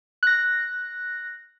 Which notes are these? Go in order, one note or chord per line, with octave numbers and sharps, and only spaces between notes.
F#6 A#6